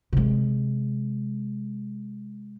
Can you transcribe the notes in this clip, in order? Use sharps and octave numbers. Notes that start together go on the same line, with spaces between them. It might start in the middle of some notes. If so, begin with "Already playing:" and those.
C3 G#3